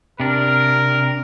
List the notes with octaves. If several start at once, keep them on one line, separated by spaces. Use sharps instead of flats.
C3 D4 A#4